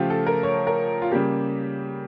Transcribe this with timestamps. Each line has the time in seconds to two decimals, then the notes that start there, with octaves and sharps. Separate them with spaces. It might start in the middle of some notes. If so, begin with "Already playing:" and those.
Already playing: C#3 F3 A3 F4 G4
0.10 A4
0.26 A#4
0.43 C#5
0.67 A#4
1.02 F4
1.11 C#3 G3 A#3 G4